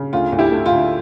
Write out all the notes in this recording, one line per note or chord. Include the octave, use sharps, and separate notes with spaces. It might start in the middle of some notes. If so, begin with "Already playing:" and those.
Already playing: C#3
D2 F4
D2
E4 G4
A3
F4
D3